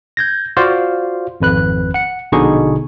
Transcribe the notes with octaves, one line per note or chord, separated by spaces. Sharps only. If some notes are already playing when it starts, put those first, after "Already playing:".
G6 G#6 A#6
F4 F#4 C5 D5 F5
G#1 F2 B4 F#6
F#5 C#7
A#1 B2 D3 D#4 G#4 C#6